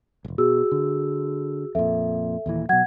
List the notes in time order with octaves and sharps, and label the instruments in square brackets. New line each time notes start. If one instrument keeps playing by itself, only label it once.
[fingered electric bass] E1 A#1
[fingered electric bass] B2 [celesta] F#4 G#4 E6
[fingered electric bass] D3
[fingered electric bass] F2 A#2 [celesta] A4 E5
[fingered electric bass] D#2 A#2 E3
[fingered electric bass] B2 F#3 [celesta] F#5 G#6